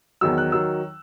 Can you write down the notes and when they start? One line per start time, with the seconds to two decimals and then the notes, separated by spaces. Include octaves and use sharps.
0.21 E2 D#3 F#3 E6
0.38 F#6
0.52 D#3 F#3 E6